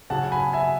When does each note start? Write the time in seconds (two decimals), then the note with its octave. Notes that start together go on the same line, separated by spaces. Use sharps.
0.10 C#3 F#3 F#5 A5
0.32 G#5 B5
0.53 E5 G#5